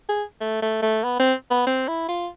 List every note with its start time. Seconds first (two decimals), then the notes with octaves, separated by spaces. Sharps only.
0.09 G#4
0.40 A3
0.62 A3
0.82 A3
1.04 B3
1.19 C4
1.51 B3
1.67 C4
1.88 E4
2.09 F4